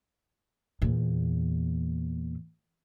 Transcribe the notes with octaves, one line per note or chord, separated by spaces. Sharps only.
E2 A#2